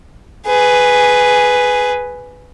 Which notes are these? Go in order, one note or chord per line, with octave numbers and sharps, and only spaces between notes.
G#4 B4